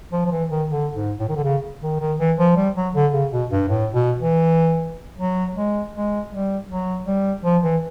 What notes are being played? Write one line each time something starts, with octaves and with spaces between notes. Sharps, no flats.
F3
F3
E3
D#3
D3
G#2
A2
D#3
D3
C#3
D#3
D#3
E3
F3
G3
F#3
D3
C#3
B2
G2
A2
B2
E3
F#3
G#3
G#3
G3
F#3
G3
F3
E3